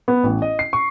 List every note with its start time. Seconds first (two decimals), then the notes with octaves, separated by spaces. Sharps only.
0.08 B3
0.24 A1
0.42 D#5
0.59 C7
0.73 C#6